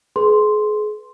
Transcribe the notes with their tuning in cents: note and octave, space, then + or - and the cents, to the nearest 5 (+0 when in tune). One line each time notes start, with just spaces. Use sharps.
G#4 +30 B4 +0 C6 +0